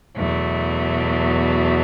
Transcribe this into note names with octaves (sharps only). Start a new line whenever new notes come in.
E2 B2 F#3 A3